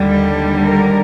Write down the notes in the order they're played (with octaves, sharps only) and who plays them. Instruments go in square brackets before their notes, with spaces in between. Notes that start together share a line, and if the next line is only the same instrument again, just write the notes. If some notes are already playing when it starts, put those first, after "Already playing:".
Already playing: [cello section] D#2 D3 G3
A#4